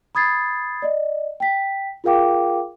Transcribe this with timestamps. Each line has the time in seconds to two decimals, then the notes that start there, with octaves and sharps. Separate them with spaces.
0.15 B5 D#6 G#6 A6 C7
0.82 D5 D#5
1.40 G5 B6
2.04 F4 G#4 A#4 F5 G5 D6